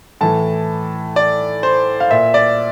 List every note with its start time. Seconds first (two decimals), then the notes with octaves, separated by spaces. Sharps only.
0.21 A2 E3 A5
1.16 D5
1.63 C5
2.00 F5
2.10 A#2 E5
2.34 D5